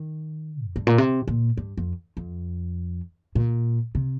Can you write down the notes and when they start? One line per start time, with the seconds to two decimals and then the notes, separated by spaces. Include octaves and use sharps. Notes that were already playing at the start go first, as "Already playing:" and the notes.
Already playing: D#3
0.66 F2
0.76 G2
0.87 A#2
0.98 C3
1.28 A#2
1.57 G2
1.77 F2
2.17 F2
3.35 A#2
3.95 C3